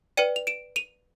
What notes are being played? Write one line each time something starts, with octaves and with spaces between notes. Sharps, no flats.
B4 D5 G5 C#7 D#7
F7
D7 E7
D#7 F7